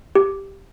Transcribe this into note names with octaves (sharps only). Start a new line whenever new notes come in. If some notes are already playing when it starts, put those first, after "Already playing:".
G4